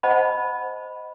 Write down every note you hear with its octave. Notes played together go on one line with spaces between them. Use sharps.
C5 D#5 F#5 A5 B5